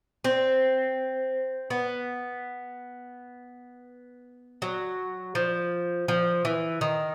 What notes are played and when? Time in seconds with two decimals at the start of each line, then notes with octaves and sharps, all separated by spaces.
0.24 C4
1.70 B3
4.62 F#3
5.35 F3
6.08 F3
6.45 E3
6.81 D#3